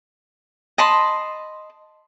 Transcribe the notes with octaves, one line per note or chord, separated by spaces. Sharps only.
D#5 A5 B5 C6